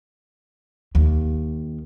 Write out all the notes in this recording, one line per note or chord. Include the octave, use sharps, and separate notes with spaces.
D#2